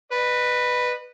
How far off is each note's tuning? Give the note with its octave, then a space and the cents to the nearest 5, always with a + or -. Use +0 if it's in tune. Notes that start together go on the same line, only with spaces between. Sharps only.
B4 +0 D#5 -45